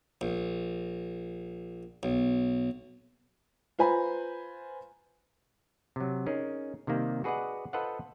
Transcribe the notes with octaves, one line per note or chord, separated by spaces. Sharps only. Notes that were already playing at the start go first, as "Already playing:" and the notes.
A#1
B1
F4 B4 C5 G#5 A#5 B5
C3 F#3
C#4 D#4 G#4 A#4
C3 D#3 G3 A#3
F#4 G#4 B4 D5 D#5 F#5
F4 A4 B4 C5 D#5 F#5